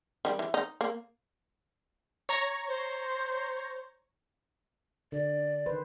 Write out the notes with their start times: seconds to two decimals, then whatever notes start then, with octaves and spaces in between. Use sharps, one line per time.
0.25 D#3 G3
0.39 E3
0.54 D#4
0.81 A#3
2.29 C#5 A#5 C#6
2.68 C5
5.12 D3 D5
5.66 D#3 B4 C5